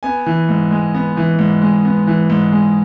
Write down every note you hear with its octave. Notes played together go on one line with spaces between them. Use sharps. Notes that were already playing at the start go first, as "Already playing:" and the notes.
B3 G#5
E3
G#2
G#3
B3
E3
G#2
G#3
B3
E3
G#2
G#3